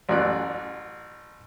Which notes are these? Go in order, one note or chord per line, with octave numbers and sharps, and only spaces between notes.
A1 F#2 D5 F#6